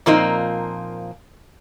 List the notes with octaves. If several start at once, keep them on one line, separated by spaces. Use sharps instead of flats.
A#2 F3 A#3 C4 D#4